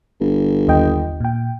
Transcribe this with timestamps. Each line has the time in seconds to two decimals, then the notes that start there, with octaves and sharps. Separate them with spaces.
0.20 G1
0.68 D#2 D#5 G5
1.20 A#2 G5